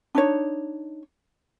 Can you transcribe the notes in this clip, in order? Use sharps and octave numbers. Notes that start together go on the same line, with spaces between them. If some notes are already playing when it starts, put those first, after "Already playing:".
D4 D#4 C#5